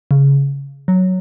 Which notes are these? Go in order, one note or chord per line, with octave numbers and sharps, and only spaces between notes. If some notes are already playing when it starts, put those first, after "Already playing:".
C#3
F#3